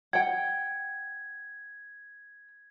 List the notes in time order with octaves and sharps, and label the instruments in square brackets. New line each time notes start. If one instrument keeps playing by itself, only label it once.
[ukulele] F#5 G5 [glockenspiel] G#6